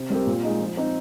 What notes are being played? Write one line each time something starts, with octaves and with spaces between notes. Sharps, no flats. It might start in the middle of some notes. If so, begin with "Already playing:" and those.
Already playing: C3
G3 C4 G4 A#4
A#2
G#3 D#4
F3
C4 D#4